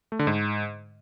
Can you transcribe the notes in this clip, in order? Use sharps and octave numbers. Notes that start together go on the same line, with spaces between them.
A3
D3
G#2